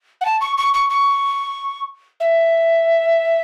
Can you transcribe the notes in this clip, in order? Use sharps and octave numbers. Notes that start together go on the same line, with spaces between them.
F#5
A5
C#6
C#6
C#6
C#6
E5